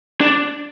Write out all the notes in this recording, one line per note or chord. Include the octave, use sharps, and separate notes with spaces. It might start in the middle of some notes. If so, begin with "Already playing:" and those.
D4